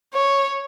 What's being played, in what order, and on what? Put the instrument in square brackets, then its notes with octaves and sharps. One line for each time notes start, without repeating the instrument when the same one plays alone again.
[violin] C#5